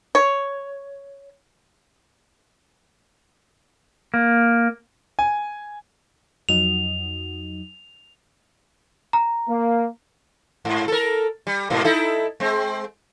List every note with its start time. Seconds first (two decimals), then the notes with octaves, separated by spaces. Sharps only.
0.15 C#5
4.14 A#3
5.19 G#5
6.49 F2 F#3 D#4 F7
9.13 A#5
9.49 A#3
10.65 G#2
10.88 A4 A#4
11.47 G3
11.70 G#2 B2 A#3
11.84 D#4 E4 A4
12.40 G#3 C4